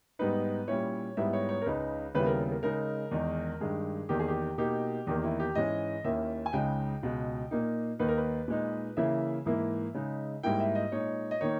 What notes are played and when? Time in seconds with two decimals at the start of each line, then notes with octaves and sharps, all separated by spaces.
0.19 G#2 G3 B3 D#4 B4
0.68 A#2 G3 C#4 E4 C#5
1.17 G#2 G3 B3 E4 E5
1.33 C#5
1.49 C#5
1.62 A#4
1.66 C#2 C#3 G#3 D#4 B4
2.15 D#2 C#3 G3 B3 E4 B4
2.26 A#4
2.51 A#4
2.63 C#3 G#3 D#4 A#4
3.11 E2 D#3 G#3 D#4
3.60 G2 D#3 G#3 G#4
4.09 E2 D#3 A#3 G4
4.20 G#4
4.28 G4
4.58 B2 A#3 D#4 G4
5.07 E2 D#3 A#3 G4
5.24 E4
5.40 G4
5.55 G#2 E3 G#3 C#4 D#5
6.04 D#2 D#3 A#3 C#4 E4 E5
6.46 G#5
6.53 C#2 C#3 G#3 D#4 G5
7.03 C#2 B2 G#3
7.51 A#2 A#3 D#4
7.99 D#2 D#3 A#3 D#4 B4
8.08 A#4
8.18 B4
8.48 A#2 G#3 D#4
8.97 C#3 E3 A#3 E4 E5
9.46 G#2 E3 A#3 E4
9.94 C#3 G#3 D#4
10.43 G#2 G3 A#3 E4 G5
10.60 E5
10.75 D#5
10.92 A#2 G#3 D#4 C#5
11.31 D#5
11.41 D#3 A#3 D#4 C#5